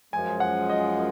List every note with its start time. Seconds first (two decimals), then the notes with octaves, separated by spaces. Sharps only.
0.13 F#2 F3 G#3 G#5
0.40 F#5
0.70 D#5